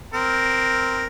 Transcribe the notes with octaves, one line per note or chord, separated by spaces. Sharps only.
C4 A#4